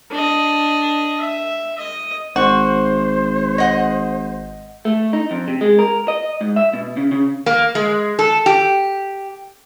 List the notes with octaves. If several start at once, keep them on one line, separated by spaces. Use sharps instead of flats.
D4 D#5
E5
D#5
G#1 F#4 C5
D#5 F#5
A3
D#4
F2
C3
G#3
A#4
D#5
G#2
E5
B2
C#3
C#3
A#3
G#3
A4
G4